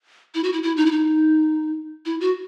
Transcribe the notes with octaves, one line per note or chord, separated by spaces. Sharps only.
E4
F#4
E4
E4
D#4
E4
D#4
E4
F#4